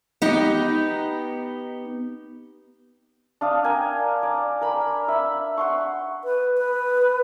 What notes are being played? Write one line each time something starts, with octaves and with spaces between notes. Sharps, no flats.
B3 D#4 G4
D4 F5 D#6
A#4 G5 G#5
D5
A#4 B5
E5 B5
F#5 C6 C#6
B4
B4